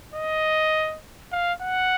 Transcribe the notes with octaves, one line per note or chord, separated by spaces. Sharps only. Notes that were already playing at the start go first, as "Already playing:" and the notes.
D#5
F5
F#5